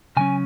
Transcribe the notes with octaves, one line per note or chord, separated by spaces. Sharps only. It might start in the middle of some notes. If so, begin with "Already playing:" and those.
C#3 F#3 C#4 G#5